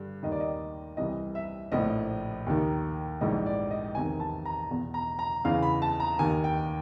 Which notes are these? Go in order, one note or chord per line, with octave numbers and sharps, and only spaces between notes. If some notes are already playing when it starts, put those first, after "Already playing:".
Already playing: G2 D3
D#2 D#3 D#5
D5
D#5
C2 C3 E3 D#5
E5
A#1 A2 F3 D#5
D#2 D#3
A#1 G#2 E3 D#5
D5
D#5
E2 C3 D#3 G#5
A5
A#5
E2 B2
A#5
A#5
E2 C#3 E3 F5
B5
A5
A#5
D#2 D#3 G#5
G5